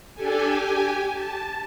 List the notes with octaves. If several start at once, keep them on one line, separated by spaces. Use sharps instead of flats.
D4 G4 A4 G#5
G4 G#5
A5